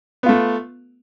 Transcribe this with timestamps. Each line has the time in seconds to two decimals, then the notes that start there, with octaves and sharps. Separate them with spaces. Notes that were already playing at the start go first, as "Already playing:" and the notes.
0.23 B3
0.26 F4
0.29 A3